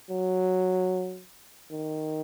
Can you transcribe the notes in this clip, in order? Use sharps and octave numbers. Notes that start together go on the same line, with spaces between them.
F#3
D#3